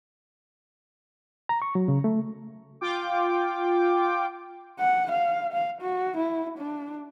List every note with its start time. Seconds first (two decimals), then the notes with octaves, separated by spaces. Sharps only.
1.49 A#5
1.62 C#6
1.75 F#3
1.88 C#3
2.04 A3
2.81 F4 G5 D6
4.79 F#5
5.11 F5
5.53 F5
5.81 F#4
6.17 E4
6.58 D4